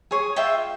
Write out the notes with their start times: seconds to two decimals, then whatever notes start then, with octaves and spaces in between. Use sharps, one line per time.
0.11 G#4 C#5
0.36 F4 E5 G5